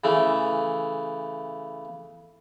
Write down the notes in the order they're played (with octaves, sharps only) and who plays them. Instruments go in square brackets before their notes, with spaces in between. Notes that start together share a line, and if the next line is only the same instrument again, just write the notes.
[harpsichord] C#3 E3 A3